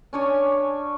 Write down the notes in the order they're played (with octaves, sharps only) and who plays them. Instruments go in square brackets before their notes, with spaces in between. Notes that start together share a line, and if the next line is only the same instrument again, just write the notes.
[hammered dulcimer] C#4 D4 C#5 G#5